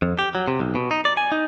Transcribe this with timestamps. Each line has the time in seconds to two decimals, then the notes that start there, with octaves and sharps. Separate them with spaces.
0.02 F2
0.19 G4
0.35 F#3
0.48 C3
0.60 B1
0.75 B2
0.91 D#4
1.05 D5
1.17 G#5
1.32 D#4